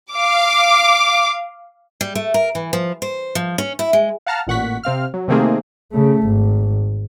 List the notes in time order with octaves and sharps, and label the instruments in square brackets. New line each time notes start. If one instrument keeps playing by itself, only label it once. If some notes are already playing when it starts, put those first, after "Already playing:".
[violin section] F5 D6
[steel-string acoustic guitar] G3
A3
A#4
E3
F3
C5
F3
C#4
E4
G#3
[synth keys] F5 F#5 A5 A#5 F6
A1 A#2 F#5 C#6 B6
C3 C4 F5 F6
F#3
C3 D#3 A3 A#3 C4 G#4
[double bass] C#3 A3
G#1